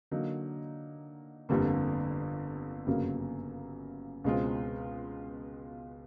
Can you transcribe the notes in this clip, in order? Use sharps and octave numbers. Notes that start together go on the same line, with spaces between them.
D3 F#3 A#3 D#4
G1 F2 D3 G3 A#3
G1 F#2 C#3 F#3 A#3
C#2 B2 G#3 C4 F4